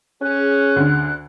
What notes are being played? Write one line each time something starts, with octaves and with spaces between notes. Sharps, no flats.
C#4 G#4 F#6
D2 D3